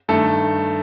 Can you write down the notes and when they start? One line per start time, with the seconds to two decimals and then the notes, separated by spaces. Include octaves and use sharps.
0.08 G2 D#3 A3 A4